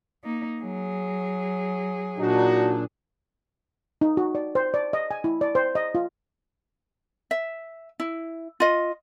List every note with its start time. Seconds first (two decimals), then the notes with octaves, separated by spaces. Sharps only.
0.24 A#3 D#4
0.61 F#3 G#4
2.18 A#2 D4 D#4 F#4
4.01 D#4
4.17 F#4
4.35 D5
4.55 C5
4.74 D5
4.93 D#5
5.11 G#5
5.24 E4
5.41 D5
5.55 C5
5.75 D#5
5.95 F4
7.31 E5
8.00 E4
8.60 F4 D#5